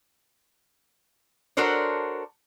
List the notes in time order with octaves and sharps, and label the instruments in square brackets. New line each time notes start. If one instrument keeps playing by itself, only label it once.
[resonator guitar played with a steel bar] D4 F#4 A4 A#4 C5 C#5